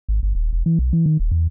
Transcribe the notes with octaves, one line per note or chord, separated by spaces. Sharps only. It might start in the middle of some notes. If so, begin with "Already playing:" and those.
G#1
G1
D#1
E1
E3
B1
E3
D#3
D#1
E2